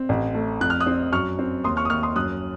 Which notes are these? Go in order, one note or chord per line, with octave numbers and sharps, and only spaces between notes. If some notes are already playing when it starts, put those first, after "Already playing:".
Already playing: C4
A1
A3
F2 F#6
F6
D#6 F#6
C4
F#2 C#6 F6
C4
D#2 C6 D#6
C#6 F6
D#6
D#2 C#6 F6
C6 D#6
F#2 D#6 F#6